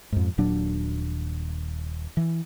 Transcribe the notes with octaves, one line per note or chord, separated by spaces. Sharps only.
F2 G#2
D#1 A#2 F#3 D4
E3